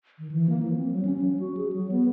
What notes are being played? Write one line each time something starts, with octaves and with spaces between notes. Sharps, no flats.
D#3
E3
A#3
F3
C4
F#3
C#4
F#3
F#4
G#4
F#3
B3